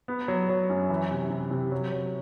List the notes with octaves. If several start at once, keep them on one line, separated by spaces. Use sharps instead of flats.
B3
F#3
F#3
F#2
E3
C3
C3
C3
F#3
F#3